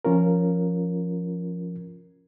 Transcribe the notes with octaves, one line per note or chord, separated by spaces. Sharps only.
F3 C#4 F4 A#4